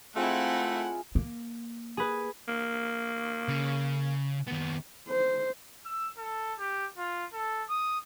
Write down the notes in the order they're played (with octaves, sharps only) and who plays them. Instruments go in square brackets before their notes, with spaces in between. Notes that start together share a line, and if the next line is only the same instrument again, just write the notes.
[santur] G#3 F4 [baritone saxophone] A3 [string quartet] C4 E4 [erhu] F#5
[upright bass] A#3
[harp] G#4 B4
[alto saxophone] A#3
[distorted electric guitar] C#3
D#2 B3
[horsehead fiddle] C5
[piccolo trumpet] E6
A4
G4
F4
A4
D#6